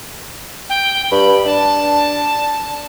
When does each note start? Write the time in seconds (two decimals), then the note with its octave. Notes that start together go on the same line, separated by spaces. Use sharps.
0.70 G5
1.11 G2 B5
1.46 D4 A5